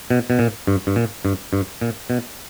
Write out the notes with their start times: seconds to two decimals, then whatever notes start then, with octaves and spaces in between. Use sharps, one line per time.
0.10 B2
0.30 B2
0.39 A#2
0.67 G2
0.87 G2
0.96 A#2
1.25 G2
1.53 G2
1.81 A#2
2.10 B2